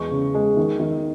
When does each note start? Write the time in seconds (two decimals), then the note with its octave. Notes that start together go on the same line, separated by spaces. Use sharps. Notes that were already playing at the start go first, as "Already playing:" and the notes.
Already playing: E2 G#3 C#6
0.11 C#3
0.34 G#3
0.57 D#3
0.80 D#3